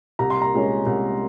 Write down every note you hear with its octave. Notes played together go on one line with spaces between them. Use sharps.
C2 A#5
C6
A#5
A#2 G#3 C#4
C2